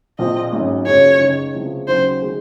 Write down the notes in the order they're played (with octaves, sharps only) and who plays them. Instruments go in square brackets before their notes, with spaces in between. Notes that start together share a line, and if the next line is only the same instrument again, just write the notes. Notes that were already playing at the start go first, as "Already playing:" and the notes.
[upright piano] A#1 A#2 F3 C4 [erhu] D#5
[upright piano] G#1 G#2 F#3 C#4
[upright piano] F#1 F#2 F3 G#3 C#4 [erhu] C#5
[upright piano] C#2 C#3 G#3 D#4
C#2 C3 F3 G#3
[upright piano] D#2 C#3 F#3 [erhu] C5
[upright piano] D#3 G#3